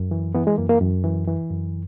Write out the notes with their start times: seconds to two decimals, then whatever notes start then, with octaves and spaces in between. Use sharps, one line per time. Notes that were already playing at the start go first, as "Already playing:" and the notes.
Already playing: F#2
0.11 E3
0.35 E3 B3
0.47 G#3
0.58 F#2 A#3
0.69 A#3
0.81 F#2
1.04 E3
1.28 E3
1.50 F#2